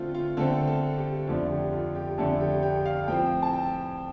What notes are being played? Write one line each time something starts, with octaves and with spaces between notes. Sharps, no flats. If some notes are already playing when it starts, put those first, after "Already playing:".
Already playing: D3 A3 C4 F4
F4
D3 A3 C4 A4
A4
G4
F2 D3 A3 D4 F4
G4
F4
G4
F2 D3 A3 D4 A4
G4
G4
F5
A2 F3 C4 G5
A5
G5